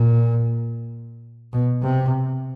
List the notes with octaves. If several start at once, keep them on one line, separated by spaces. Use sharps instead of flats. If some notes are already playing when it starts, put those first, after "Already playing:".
Already playing: A#2
B2
C3